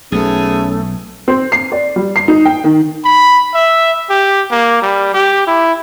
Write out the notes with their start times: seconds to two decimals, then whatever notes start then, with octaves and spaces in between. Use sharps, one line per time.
0.12 B1 A3 B3 C#4 G#4
1.28 C4
1.52 C7
1.72 D5
1.96 G3
2.16 C7
2.28 D#4
2.45 G5
2.64 D#3
3.05 B5
3.54 E5
4.10 G4
4.51 A#3
4.82 G3
5.14 G4
5.47 E4